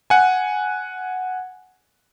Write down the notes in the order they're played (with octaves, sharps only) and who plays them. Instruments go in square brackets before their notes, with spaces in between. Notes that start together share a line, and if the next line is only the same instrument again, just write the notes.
[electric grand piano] F#5 G#5